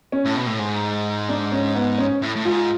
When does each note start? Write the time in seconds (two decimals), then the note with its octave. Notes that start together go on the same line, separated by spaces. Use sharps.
0.12 C#4
0.25 A2
0.36 B2
0.46 A2
0.59 G#2
1.29 D4
1.52 C#4
1.75 B3
1.98 C#4
2.22 A2
2.36 A2
2.45 G#2 F4